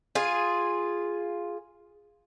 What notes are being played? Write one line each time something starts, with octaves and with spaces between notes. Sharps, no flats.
F4 G#4